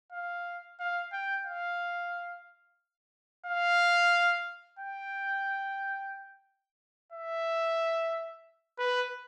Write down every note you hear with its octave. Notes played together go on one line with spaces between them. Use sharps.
F5
F5
G5
F5
F5
G5
E5
B4